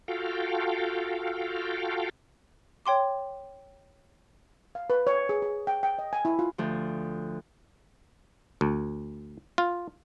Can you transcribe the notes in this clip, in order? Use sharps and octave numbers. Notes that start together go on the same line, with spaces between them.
F4 F#4 A4 F5 G5
C#5 G5 C6 D6
F5
B4
C#5
G#4
G#4
G5
G5
D#5
G#5
E4
F4
D2 F3
D2
F4